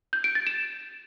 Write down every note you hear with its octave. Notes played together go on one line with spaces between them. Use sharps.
G6
D7
A6
E7